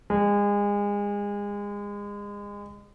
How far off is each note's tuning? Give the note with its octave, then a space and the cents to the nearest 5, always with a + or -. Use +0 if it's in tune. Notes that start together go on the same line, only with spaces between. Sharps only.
G#3 -30